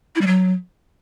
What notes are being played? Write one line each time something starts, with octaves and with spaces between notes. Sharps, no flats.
E4
G3
F#3